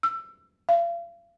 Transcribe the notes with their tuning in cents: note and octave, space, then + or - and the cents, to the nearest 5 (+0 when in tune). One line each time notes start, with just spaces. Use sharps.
E6 +25
F5 -40